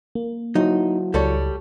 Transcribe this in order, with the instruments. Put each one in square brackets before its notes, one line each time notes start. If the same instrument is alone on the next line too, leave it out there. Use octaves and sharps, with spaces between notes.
[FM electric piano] A#3
[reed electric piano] F#3 E4 F#4 [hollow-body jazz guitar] D#4
[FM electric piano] C#2 [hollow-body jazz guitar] G3 A4 C#5